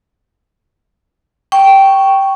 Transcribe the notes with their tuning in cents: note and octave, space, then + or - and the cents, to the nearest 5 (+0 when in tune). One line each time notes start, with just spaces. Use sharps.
G5 -10 C#6 +0